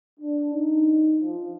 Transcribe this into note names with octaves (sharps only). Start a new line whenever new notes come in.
D4
D#4
F3